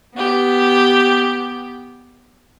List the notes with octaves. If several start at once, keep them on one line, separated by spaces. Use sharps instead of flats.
B3 G4